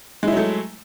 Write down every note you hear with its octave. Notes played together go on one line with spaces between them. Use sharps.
F#3 G#3 A3 E4